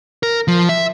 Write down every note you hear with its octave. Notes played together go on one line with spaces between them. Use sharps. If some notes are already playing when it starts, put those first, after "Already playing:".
A#4
F3
E5